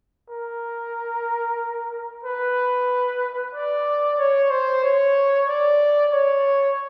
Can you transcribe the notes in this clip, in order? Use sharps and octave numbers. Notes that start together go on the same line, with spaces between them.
A#4
B4
D5
C#5
C5
C#5
D5
C#5